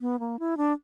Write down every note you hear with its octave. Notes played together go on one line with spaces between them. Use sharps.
B3
A#3
E4
D4